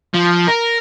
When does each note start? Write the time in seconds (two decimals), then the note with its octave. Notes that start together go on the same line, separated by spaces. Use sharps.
0.14 F3
0.48 A#4